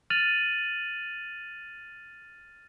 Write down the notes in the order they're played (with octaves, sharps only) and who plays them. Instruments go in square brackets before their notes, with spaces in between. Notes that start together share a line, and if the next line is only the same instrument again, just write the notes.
[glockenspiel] F6 A6 D#7 F7 F#7